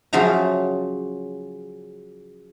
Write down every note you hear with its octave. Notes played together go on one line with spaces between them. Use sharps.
C#3 F3 F#3 E5 A#5